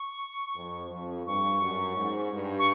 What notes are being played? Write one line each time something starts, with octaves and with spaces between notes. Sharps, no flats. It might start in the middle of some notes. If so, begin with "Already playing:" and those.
Already playing: C#6
F2
F2
G2 C#6
F#2
G#2
G2
C#6